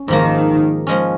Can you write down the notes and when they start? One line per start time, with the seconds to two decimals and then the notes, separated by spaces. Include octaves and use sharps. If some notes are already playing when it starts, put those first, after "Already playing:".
Already playing: C#4
0.08 G#2 D#3 F3 A#3
0.87 F3 G#3 C#4